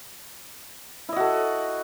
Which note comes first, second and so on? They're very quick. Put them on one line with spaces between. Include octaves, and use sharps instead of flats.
E4 D#5 F#4 A4